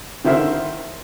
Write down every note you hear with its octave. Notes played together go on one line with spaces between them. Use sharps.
D3 D#3 E4 C5 E5 F6